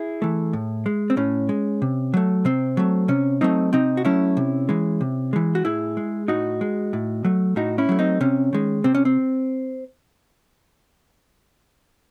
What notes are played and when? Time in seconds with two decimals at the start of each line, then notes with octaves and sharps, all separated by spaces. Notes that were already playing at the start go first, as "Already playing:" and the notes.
Already playing: E4 G#4
0.22 E3 A3
0.53 A2
0.86 G#3
1.10 C4
1.17 A2 C#4
1.49 G#3
1.82 C3
2.14 F#3 A3
2.45 C3 C4
2.77 F#3 A3
3.08 C3 C#4
3.41 F#3 A3 C4 D#4
3.73 C3 C4 D#4
3.97 F#4
4.05 F#3 A3 C#4 E4
4.37 C3
4.69 E3 G#3
5.01 C3
5.33 E3 G#3
5.55 F#4
5.65 A2 E4 G#4
5.97 G#3
6.28 A2 D#4 F#4
6.61 G#3
6.93 A2
7.25 F#3 A3
7.56 A2 D#4 F#4
7.78 C#4 E4
7.89 F#3 A3
7.99 C4 D#4
8.21 C3 C#4
8.53 D#3 G#3
8.84 C3 C4
8.95 C#4
9.05 C4